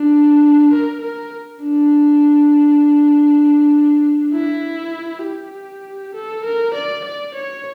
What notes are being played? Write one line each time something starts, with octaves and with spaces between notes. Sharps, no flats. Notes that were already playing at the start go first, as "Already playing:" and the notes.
Already playing: D4
A#4
A#4
D4
E4
G4
A4
A#4
D5
D5
C#5